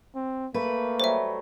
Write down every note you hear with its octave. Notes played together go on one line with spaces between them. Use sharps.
C4
A3 A#3 B4
F#3 G3 C5 E5